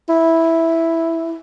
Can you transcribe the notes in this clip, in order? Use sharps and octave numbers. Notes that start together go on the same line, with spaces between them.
E4